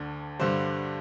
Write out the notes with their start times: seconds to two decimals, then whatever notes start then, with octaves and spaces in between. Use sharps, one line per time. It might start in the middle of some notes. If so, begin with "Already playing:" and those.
Already playing: D2 D3
0.40 G2 D3 G3 C5